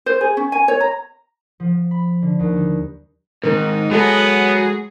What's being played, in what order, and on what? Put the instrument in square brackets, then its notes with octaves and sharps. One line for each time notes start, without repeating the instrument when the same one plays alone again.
[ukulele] C5
G#4
C#4
G#5
C#5
A#5
[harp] F3
B5
D3
D#2
G3
[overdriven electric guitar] G#2 [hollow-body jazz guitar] D#3 C4 A#4 [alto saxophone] D#4
[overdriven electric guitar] F#3 F#4 [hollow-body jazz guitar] G#3 A4 E5 [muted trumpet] B3 [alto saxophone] G#4